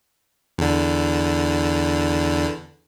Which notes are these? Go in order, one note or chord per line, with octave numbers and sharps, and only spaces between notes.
E2 D3